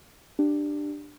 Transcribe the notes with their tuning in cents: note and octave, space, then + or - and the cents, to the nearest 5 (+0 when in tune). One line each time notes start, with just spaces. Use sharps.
D4 +10 G4 +0